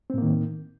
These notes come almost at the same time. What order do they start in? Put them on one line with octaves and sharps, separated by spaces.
C4 A2 A#3 D#3